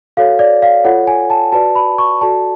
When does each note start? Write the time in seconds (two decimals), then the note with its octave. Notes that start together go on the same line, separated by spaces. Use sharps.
0.17 F#4 A4 C#5 F5
0.39 D5
0.62 F5
0.84 F4 A4 C#5 F#5
1.07 G#5
1.30 A5
1.52 F#4 B4 D5 A5
1.75 B5
1.98 C#6
2.21 F#4 A4 D5 A5